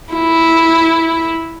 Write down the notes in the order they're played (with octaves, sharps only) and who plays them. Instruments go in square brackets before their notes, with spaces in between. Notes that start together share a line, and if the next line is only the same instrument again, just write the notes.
[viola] E4